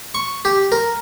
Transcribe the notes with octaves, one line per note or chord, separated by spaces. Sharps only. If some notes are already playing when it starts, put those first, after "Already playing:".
C#6
G4
A#4